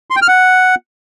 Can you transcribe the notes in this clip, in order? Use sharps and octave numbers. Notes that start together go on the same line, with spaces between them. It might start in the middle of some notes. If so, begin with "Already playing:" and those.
C6
G5
F6
F#5